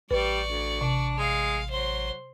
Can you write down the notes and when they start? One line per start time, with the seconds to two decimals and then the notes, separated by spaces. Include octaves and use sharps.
0.11 A1 G3 B4 D5 C#6
0.48 D2
0.81 C3 D4
1.18 G#3 F5
1.70 F#3 C5 C6